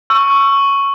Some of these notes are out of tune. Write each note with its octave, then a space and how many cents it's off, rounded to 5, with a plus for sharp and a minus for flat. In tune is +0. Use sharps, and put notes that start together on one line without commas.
C#6 +0 E6 +25